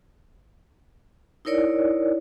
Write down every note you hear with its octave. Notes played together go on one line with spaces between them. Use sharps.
D#4 E4 A#4 C#5 D5